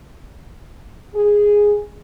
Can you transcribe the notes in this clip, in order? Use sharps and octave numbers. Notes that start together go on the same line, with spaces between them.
G#4